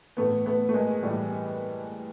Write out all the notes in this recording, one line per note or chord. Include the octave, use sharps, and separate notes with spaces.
A2 E3 A3 B3
A3 B3
A3
G#3 A#3
A2 E3 G3 A3